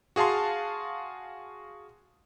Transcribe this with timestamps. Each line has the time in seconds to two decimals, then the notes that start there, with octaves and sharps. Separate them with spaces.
0.16 F#4 G#4 F5 A5 C6